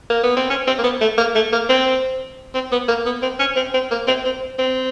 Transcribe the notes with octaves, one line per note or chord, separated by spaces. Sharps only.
A#3
B3
C4
C#4
C4
A#3
B3
A3
A#3
A3
A#3
C4
C4
B3
A#3
B3
C4
C#4
C4
C4
A#3
C4
C4
C4